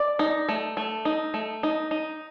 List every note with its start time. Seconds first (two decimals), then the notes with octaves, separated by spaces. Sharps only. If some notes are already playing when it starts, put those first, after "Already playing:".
Already playing: D5
0.19 D#4
0.48 A3
0.77 A3
1.05 D#4
1.34 A3
1.63 D#4
1.91 D#4